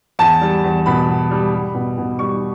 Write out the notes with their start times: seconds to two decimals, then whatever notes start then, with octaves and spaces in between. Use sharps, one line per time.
0.19 E2 A5
0.41 G3
0.64 E2
0.86 B2 B5
1.09 E2
1.31 G3
1.53 G3
1.74 B2
1.98 B2
2.19 G3 C#6